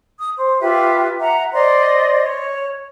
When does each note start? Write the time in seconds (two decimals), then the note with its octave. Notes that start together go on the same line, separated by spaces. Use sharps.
0.18 D#6
0.36 C5
0.60 F4 G4 B4 E5
1.19 E5 F#5 A#5
1.53 C5 D5 D#5 C6
2.24 C#5